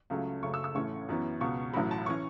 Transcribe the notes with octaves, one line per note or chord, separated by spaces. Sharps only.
C#2 C#3 F#3 A3 C#4
F#1 F#2 C#3 A3 C#6
E6
E6
A1 A2 A3 C#4 C#6
F#2 E3 B3
C#2 B2 B3 C#6
A1 A2 F#3 B5
A5
E3 C#4 C#6